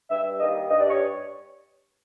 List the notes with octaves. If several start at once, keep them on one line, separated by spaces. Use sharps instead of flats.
G2 E5
D#3 G3 A#3 D#5
G2 D#5
D5
C#5